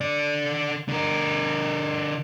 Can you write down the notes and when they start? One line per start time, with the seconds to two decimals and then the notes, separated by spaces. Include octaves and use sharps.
0.01 D3 D5
0.89 D3 A#4